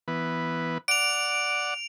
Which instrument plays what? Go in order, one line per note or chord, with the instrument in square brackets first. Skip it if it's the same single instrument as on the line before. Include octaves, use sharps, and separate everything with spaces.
[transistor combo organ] E3 B3 B4
[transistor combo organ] D5 F#5 [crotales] D7 F7